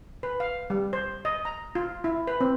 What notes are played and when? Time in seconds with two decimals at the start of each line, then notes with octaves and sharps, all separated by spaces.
0.23 B4
0.40 F5
0.70 G3
0.93 C5
1.25 D#5
1.45 A#5
1.75 F4
2.04 E4
2.27 B4
2.41 C4